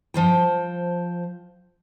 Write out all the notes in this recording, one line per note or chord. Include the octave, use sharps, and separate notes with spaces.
F3 C5 G5